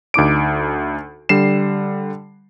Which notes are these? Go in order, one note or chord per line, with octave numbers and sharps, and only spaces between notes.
D2 D#4 D6 D7
D3 G3 C7 E7